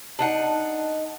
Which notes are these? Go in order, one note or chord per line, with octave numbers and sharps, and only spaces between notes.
D4 D#4 F#5